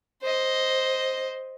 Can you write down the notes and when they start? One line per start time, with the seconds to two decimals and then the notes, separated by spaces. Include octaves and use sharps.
0.22 C5 D#5